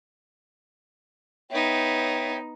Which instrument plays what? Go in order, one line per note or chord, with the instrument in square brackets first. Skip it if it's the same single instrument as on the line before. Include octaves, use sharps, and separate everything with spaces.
[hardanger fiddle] B3 D#4 [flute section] C#5 E5 G5